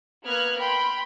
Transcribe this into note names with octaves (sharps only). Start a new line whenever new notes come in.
A#3 B3 B4 F6 F#6 G#6
G5 B5 C6